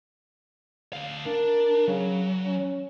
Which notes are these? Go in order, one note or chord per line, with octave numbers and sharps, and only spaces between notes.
D2 F5
D4 A#4
C#3 F#3
C#4